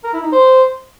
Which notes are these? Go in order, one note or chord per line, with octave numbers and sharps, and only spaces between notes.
A#4
E4
D#4
C5